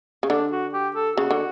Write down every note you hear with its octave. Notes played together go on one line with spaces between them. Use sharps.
C#3
D3 D4
F#4
G4
A4
C#3 F#4
D3